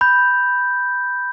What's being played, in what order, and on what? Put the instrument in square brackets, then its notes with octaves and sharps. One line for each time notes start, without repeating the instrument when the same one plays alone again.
[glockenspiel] B5 G6